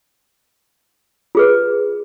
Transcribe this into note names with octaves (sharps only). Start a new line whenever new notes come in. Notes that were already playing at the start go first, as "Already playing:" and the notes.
F4 G#4 B4